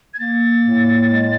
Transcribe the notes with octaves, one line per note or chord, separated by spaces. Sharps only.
G#6
A#3 A6
A2
G#3